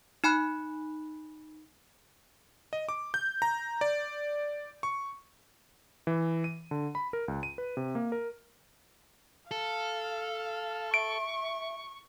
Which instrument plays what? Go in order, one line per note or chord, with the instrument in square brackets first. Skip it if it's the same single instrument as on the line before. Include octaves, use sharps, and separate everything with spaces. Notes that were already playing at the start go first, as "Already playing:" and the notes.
[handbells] D#4 G#5 B5 F#6
[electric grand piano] D#5
D6
G6
A#5
D5
C#6
E3
D#7
D3
B5
A#4
C#2
D#7
B4
C3
A#3
A#4
[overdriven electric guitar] A4 [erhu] F5
[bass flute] E5 [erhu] C#6 [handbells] D7